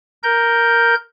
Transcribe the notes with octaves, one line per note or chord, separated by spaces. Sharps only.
A#4 G6